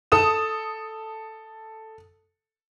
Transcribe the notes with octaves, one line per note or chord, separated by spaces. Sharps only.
A4 D#6 E7